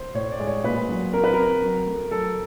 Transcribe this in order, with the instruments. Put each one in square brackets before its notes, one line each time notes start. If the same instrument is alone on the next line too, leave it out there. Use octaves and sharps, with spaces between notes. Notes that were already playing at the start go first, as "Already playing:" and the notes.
Already playing: [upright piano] C5
[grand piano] A2 [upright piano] C#5
[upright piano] D5
[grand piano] G#3
[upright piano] C#5
[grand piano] A#2 [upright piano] B4
[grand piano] F#3
[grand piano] C4 [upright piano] A#4
[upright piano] B4
[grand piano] C4 [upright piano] A#4
[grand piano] F#3
A3
[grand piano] F#3 [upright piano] A4